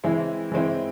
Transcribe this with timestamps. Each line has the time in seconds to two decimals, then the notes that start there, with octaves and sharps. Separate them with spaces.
0.04 E3 G#3 C4 E4
0.52 E3 G#3 C4 E4